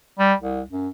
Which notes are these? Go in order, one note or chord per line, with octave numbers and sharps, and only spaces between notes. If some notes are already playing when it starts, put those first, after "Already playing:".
G3
C2
F#2